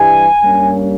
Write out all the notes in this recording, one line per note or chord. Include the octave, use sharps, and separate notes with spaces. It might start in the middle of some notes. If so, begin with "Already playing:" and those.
Already playing: G2 E3 G3 G#5
G2 G3 A#3 C#4